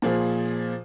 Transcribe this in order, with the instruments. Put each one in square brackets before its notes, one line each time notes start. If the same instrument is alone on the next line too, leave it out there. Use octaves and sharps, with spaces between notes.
[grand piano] A#2 F3 G#4